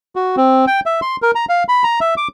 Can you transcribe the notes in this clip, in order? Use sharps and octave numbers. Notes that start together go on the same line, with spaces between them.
F#4
C4
G5
E5
C6
A#4
A#5
F5
B5
A#5
E5
D6